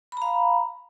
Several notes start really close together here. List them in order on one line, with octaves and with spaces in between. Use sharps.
B5 A#5 F5